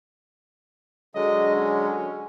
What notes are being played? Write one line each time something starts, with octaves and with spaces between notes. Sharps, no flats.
D3 F#3 G#3 D#5
C#4